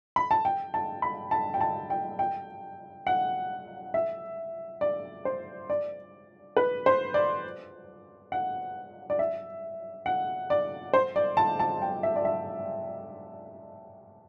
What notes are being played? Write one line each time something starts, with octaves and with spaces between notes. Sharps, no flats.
B5
A5
G5
A5
B5
A5
G5
A5
G5
G5
F#5
E5
D5
C5
D5
B4
C5
D5
F#5
D5
E5
F#5
D5
C5
D5
A5
A5
G5
E5
D5
E5